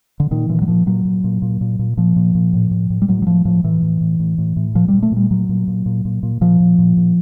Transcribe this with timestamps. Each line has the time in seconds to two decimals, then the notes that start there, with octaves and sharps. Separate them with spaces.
0.20 D3
0.31 A#2 D#3
0.49 A#2 E3
0.62 F#3
0.68 A#2 F3
0.86 A#2 F#3
1.05 A#2
1.24 A#2
1.42 A#2
1.61 A#2
1.79 A#2
1.97 A#2 F3
2.16 A#2
2.35 A#2
2.53 A2
2.71 A2
2.90 A2
3.02 G3
3.08 A2 F#3
3.22 F#3
3.27 A2 F3
3.45 A2 F3
3.64 A2 E3
3.82 A2
4.01 A2
4.20 A2
4.38 A2
4.57 A2
4.75 A#2 F3
4.88 G3
4.93 A#2
5.03 A3
5.12 A#2 G3
5.31 A#2 F#3
5.49 A#2
5.68 A#2
5.86 A#2
6.05 A#2
6.23 A#2
6.41 A#2 F3
6.60 A#2
6.79 A#2
6.97 A#2